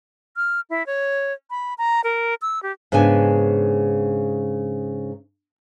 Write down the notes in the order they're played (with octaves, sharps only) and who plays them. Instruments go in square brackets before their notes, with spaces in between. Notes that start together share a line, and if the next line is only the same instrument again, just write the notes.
[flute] F6
E4
C#5
B5
A#5
A#4
E6
G4
[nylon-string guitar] G#2 C#3 B3 D4 G#5